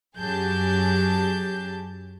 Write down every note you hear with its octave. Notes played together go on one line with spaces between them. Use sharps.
F#2 F#3 G4 G#4 A5 G6